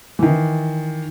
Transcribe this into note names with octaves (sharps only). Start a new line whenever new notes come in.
D#3 E3